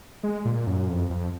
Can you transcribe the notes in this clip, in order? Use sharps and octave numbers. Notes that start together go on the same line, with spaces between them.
G#3
A#2
F#2
F2
F2